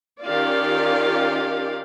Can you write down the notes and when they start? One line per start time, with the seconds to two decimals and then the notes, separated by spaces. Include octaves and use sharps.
0.21 D#3 C#4 F4 G4 D5 F5